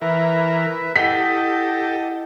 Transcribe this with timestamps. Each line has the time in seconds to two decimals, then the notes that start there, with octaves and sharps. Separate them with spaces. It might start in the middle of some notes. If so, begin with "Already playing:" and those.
0.02 E3 A#4 B4 E5
0.96 E4 G4 A4 D#5 F#5 B6